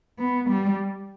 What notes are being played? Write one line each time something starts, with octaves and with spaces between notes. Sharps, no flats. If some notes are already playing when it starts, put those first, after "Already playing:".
B3
G3